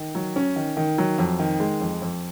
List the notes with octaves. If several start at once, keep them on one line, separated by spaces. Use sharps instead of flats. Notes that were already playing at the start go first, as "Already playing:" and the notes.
Already playing: D#3
F#3
C#4
D#3
D#3
F#3
F2
D#3
G#3
F2
F2